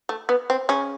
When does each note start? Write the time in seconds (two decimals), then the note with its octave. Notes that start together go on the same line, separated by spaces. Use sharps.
0.09 A3
0.29 B3
0.50 C4
0.69 C#3 C#4